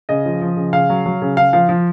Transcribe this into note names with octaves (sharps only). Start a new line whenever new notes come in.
C#3 D#5
F3
F3
C#3
C#3 F5
F#3
F#3
C#3
C#3 F5
F3 F5
F3